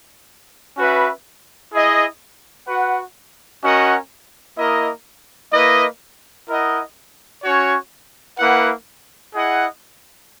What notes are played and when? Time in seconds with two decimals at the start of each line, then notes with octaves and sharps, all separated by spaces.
0.78 C#4 F#4 B4 E5
1.73 E4 G#4 D#5
2.68 F#4 B4 F#5
3.63 C#4 F#4 A#4 D#5 F#5
4.58 A#3 E4 A#4 D#5
5.53 A#3 E4 B4 D#5
6.49 E4 A#4 D#5 F#5
7.44 C#4 F#4 C#5
8.39 A#3 E4 B4 F#5
9.34 E4 G#4 D#5 F#5